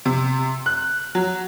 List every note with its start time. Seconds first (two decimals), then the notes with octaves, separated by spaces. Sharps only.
0.05 C3
0.66 F#6
1.15 F#3